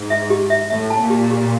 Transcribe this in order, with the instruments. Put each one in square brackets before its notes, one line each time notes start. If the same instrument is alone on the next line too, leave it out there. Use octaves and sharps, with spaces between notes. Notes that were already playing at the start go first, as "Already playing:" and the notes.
Already playing: [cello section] G#2
[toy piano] E5
G4
E5
[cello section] A2 [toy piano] E5
[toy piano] A5
[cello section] A#2
[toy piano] G4
G4